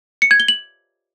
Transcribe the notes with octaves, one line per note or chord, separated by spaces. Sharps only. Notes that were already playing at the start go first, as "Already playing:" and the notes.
C#7
G#6
G7
F#7